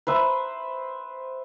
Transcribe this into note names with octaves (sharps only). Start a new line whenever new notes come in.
B4 C5 E5